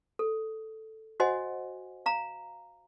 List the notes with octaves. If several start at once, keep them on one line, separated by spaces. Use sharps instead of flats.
A4
F#4 C5 D#5 F#5 G#5
F5 A#5